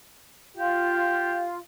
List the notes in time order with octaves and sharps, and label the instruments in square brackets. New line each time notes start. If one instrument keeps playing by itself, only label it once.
[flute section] F4 F5 [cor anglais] G4